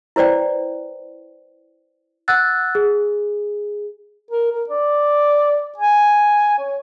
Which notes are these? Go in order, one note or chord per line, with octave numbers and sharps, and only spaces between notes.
E4 B4 C5 D5 G5
F#5 E6 F#6 A6
G#4
A#4
A#4
D5
G#5
C#5